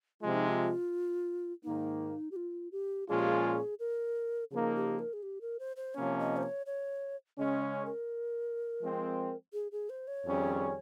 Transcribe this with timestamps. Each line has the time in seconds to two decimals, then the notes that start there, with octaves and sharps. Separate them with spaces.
0.21 C3 F3 G#3 F4
0.34 D#4
0.48 F4
1.64 G#2 D#3 A#3 D#4
2.32 G4
2.36 F4
2.72 G4
3.08 A#2 F3 G#3 C#4 F4 G#4
3.19 G4
3.28 G#4
3.80 A#4
4.51 C#3 F3 A#3 D#4 G#4
4.75 G4
4.99 A#4
5.13 G#4
5.23 G4
5.41 A#4
5.59 C5
5.77 C5
5.95 C3 F3 A#3 C#4 C#5
6.19 D#5
6.37 C5
6.43 C#5
6.66 C#5
7.38 C#3 G#3 C#4 D#5
7.62 C#5
7.86 A#4
8.82 F3 G#3 C4
9.53 G#4
9.72 G#4
9.90 C5
10.08 C#5
10.25 F2 D#3 G3 C#4 G#4